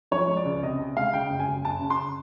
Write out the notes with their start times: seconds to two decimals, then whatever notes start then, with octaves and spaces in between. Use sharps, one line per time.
0.11 F3 C#5
0.28 G#3
0.37 D5
0.45 C#2
0.63 C3 D#5
0.79 C3
0.96 G#3 F5
1.13 C#3 G5
1.30 F#1
1.40 G#5
1.48 F#1
1.65 F#1 A5
1.81 C#3
1.90 C6